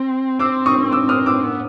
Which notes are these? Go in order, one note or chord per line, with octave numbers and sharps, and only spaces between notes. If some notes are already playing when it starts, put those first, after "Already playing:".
Already playing: C4
C4 D6 E6
C#6 D#6
D6 E6
D#6 F6
D6 E6
B3